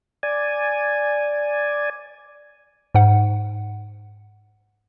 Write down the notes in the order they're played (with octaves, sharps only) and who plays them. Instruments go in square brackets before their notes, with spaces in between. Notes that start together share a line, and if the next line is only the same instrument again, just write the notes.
[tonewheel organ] D5 G#5
[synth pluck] G#2 F#5